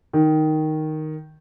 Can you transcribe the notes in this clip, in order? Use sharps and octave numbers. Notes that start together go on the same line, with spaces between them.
D#3